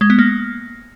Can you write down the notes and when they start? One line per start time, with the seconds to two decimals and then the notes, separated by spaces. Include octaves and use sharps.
0.01 G#3
0.10 B3
0.19 A#3